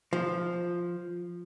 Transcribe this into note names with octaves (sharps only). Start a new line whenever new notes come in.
F3